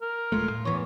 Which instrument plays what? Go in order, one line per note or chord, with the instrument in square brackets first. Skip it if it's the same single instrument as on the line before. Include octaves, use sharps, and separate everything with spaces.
[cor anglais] A#4
[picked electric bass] D#1 G#3 A3 [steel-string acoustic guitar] F4
[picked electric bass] A2
[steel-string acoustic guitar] E2 E3 [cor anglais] C#5